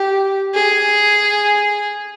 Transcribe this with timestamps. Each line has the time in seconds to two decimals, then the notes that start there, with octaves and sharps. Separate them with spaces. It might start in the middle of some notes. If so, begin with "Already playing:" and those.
Already playing: G4
0.54 G#4